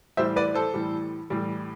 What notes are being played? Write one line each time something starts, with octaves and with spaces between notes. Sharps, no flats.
A2 E3 G3 C5 E5
B4 D5
A4 C5
A2 E3 G3
A2 E3 G3